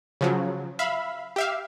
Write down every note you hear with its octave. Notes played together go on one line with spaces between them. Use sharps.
C#3 F3 F#3
E5 F5 B5
G4 E5 F5